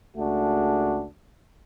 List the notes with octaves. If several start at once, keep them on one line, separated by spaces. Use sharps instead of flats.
C#2 A3 D4 F#4 G#4